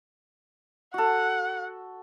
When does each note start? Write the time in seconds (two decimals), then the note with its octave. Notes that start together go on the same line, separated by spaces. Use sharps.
0.94 F#4 A4 F#5